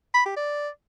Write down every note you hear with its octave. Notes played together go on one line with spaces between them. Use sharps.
B5
G4
D5